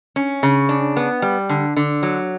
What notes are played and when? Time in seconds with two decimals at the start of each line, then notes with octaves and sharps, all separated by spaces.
0.16 C#4
0.43 C#3
0.69 D4
0.97 B3
1.22 G3
1.49 D3
1.77 D3
2.03 F#3